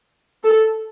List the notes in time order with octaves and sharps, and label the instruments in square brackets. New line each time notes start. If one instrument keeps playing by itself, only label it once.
[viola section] A4